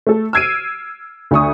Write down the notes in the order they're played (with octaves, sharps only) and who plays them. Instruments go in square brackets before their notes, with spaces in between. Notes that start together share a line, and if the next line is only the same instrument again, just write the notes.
[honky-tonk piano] A3 A4
E6 F6 G#6 C7 D7 D#7
D2 D4 C#6 D#6